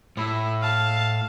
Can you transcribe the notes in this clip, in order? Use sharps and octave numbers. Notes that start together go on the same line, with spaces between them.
A2 E4
F5 A5